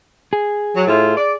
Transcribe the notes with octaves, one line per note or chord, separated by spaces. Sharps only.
G#4
F#3
A2 A3 F4
D5